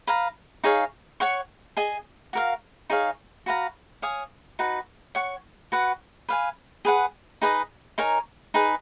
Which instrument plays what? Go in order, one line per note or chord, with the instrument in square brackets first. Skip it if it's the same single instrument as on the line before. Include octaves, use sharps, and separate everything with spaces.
[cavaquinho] B4 F5 A#5
D#4 G#4 C#5 F5
C#5 F#5 C#6
G#4 D#5 G#5
F#4 A#4 F5
D#4 G#4 C#5 F5
F#4 B4 F5 A#5
C#5 F5 G#5 D#6
D#4 F#4 B4
C#5 F#5 C#6
F#4 B4 F#5
B4 F5 G#5
G#4 B4 F#5
D#4 G#4 B4 D#5
D#4 A#4 C#5 G#5
D#4 G#4 B4